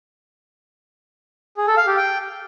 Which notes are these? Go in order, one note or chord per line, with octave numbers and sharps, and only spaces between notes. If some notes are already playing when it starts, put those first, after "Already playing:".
G#4
A4
F5
G4
G5